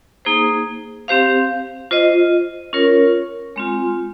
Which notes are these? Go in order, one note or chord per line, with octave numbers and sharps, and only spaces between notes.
A#3 D#4 G#4 C5
C4 G4 C5 F5
F4 C5 D#5
C#4 F4 A#4 C#5
G#3 C4 F4